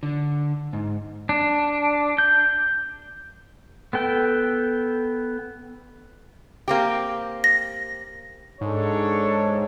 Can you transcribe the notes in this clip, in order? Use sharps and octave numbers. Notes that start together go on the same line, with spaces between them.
D3
G#2
D4
G6
B3 A4 G5
A#3 C4 G4
A#6
G#2 D4 A4 C#5